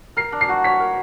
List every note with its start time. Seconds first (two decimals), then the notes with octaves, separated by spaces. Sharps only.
0.17 A#4 C7
0.32 D4
0.41 C7
0.49 F#4
0.64 C#5 B6
0.80 A#4